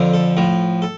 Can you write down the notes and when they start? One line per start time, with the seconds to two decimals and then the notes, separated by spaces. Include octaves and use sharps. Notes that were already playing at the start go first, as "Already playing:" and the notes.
Already playing: F2 D3 F3
0.14 A4
0.37 A2 F3
0.82 A4